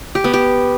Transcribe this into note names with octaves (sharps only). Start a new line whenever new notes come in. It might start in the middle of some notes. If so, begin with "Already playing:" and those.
G4
B3
G4